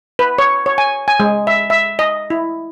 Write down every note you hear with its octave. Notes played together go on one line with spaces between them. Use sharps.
B4
C#5
C#5
G#5
G#5
G#3
E5
E5
D#5
E4